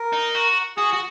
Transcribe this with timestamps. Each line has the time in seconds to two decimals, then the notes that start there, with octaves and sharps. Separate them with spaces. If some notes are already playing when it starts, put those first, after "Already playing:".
Already playing: A#4
0.13 D#4
0.35 F#4
0.77 F#4 G#4
0.93 F#4